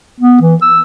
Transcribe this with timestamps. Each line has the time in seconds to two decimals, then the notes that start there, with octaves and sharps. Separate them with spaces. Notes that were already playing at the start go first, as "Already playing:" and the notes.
0.20 B3
0.41 E3
0.62 E6